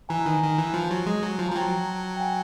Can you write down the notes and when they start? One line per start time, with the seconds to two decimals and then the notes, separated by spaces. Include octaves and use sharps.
0.09 E3 G#5 A#5
0.26 D#3
0.42 D#3
0.58 E3
0.74 F3
0.91 F#3
1.06 G#3
1.23 F#3
1.39 F3
1.49 A#5
1.51 F3
1.55 F#3 G5 A5
2.16 G5
2.20 F#5 G#5